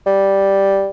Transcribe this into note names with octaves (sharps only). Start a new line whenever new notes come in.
G3